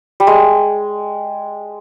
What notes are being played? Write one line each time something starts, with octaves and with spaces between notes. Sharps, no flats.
G3
G#3